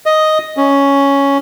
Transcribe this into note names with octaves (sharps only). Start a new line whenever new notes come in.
D#5
C#4